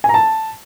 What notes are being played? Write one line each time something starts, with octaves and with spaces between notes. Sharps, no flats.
G#5
A#5
A5